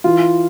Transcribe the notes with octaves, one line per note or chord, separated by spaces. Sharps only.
E3 F4